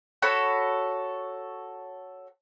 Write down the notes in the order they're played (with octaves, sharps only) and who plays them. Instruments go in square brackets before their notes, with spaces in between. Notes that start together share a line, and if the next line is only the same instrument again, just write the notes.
[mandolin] F#4 A4 C#5 B5